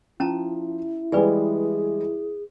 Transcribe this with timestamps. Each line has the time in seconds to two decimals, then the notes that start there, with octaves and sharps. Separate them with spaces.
0.20 F3 C#4 E4 A5 A#5
1.12 E3 G3 G#3 G#4 B4 D5 G#5